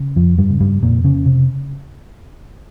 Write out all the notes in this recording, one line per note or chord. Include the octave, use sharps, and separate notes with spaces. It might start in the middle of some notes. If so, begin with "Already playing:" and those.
Already playing: C#3
F2 F3
G2 G3
C#3
G2 G3
F2 A#2 A#3
C#3 C#4
C#3
C3